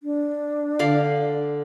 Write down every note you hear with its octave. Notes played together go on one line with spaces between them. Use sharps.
D4
D3 D5 F5